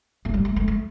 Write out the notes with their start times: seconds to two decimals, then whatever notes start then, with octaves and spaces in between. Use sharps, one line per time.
0.25 A3
0.34 G3
0.45 A3
0.56 A3
0.68 A3